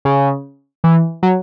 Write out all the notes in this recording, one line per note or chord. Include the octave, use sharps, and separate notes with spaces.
C#3
E3
F#3